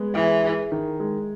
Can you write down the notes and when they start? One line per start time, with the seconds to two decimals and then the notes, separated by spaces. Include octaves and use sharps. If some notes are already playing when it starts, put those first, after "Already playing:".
Already playing: G#3 B3
0.14 E3 G#4
0.43 G#4
0.72 D#3
1.00 G#3